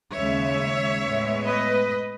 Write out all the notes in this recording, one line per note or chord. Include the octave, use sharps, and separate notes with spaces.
D#2 C#3 G#3 C#5 E5
A2 G#3 B3
B4 D#5